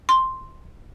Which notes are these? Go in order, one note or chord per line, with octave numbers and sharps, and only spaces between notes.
C6